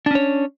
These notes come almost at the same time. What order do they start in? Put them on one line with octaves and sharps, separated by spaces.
D4 C#4 C#5